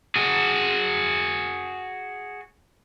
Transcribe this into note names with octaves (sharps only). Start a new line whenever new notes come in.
F#4 G#4